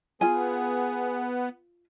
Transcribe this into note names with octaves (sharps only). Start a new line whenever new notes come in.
B3 F4 G#4 G#5